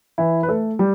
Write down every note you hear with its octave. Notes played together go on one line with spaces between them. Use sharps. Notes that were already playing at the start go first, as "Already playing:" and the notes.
E3 E4
B4
A3 A4
G3 G4